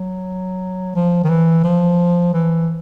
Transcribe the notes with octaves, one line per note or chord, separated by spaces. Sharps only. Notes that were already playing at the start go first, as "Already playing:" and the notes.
Already playing: F#3
F3
D#3
E3
F3
E3